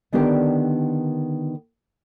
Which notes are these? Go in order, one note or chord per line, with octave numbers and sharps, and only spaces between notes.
D3 D#3 B3 D4 G4 A#4